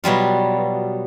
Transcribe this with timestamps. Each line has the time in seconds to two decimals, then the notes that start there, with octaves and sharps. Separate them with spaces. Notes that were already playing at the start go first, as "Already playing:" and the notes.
0.04 B2 F#3 G3 F4